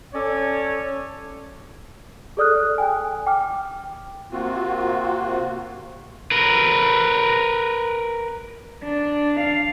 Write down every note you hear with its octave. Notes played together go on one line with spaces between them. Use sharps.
C#4 A4 C#5 D5
G#4 A4 D5 D#6 F6 F#6
G5 G#5
G#5
G5 D6 F6
C3 A#3 C4 F4 F#4
A#4 B4
D4
F5